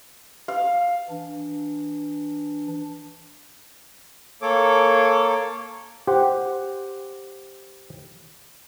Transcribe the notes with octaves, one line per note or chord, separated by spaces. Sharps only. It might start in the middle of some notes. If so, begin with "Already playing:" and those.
F5
E3 D4
A#3 A4 C#5 D6
G4 C5 F#5